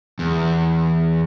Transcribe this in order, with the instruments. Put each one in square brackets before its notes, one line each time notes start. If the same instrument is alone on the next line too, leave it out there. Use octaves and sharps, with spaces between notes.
[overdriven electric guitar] E2